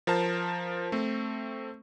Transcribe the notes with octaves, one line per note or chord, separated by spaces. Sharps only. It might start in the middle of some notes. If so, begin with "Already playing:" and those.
F3 A#4 C5 A5
A3 C4